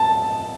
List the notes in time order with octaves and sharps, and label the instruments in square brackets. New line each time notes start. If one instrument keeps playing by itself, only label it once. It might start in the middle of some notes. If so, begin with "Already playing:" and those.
Already playing: [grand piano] A5